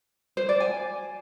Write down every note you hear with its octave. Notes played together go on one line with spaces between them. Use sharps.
C5
D5
G#5